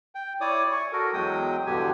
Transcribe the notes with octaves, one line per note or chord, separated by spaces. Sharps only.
G5
E4 C#5 D5 D6 D#6
G#5 C#6
F#4 A4 A#4
E2 F#3 G#3 G5 D#6
E2 G2 B2 D3 G4 G#5